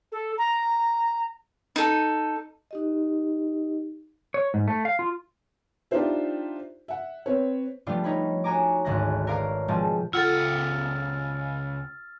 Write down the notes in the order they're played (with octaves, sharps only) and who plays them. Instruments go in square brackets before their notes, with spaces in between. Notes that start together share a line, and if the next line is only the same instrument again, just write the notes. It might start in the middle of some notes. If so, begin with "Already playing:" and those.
[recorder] A4
A#5
[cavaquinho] D#4 A4
[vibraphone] D#4 G4 D#5
[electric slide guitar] C#5
G#2
A3
F5
F4
[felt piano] D4 D#4 F4 G4 C5 E5
E5 F#5
C4 B4 C#5
[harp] F3 G3 A3 B3 D4 F4
D#4 C#5 B5
F#4 C#5 G#5 A#5 D6
G#1 D2 C#4 F#6 A#6
A#4 B4 C#5 D5 F5 A#5
B2 F3 G#3 C4 A5
[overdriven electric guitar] C#2 F#5 [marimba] F4 A4 [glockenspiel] E6 F6 A6